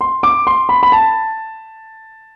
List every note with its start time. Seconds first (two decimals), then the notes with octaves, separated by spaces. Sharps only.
0.01 C6
0.23 D6
0.47 C6
0.69 B5
0.83 B5
0.92 A5